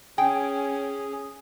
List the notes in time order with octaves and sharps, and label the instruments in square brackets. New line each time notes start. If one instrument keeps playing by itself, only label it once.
[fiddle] C#4 [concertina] G#4 [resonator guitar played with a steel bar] G5 [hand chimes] G#5